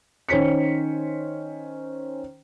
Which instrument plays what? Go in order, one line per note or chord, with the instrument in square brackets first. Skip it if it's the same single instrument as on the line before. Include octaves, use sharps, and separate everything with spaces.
[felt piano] D#3 C#4 C5 B6 C#7